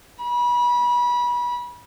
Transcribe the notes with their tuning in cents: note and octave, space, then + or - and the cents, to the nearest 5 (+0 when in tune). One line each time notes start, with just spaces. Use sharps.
B5 -30